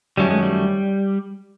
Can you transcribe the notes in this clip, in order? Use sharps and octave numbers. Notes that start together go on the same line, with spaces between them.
F#2 D#3 F#3 G3 A3 C#4
G#3
G3